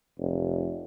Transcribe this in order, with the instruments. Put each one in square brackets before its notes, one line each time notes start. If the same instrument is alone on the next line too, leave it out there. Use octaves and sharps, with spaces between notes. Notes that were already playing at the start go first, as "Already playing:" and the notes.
[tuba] F1